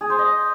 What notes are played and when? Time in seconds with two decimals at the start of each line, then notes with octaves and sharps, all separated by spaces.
0.01 G#4
0.10 C5
0.19 D#5